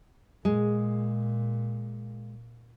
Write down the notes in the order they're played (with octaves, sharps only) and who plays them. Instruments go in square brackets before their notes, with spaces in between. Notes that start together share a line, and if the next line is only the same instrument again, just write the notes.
[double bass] A#2 [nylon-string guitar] G#3